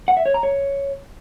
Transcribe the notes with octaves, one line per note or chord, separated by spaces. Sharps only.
F#5
E5
C#5
A#5
C#5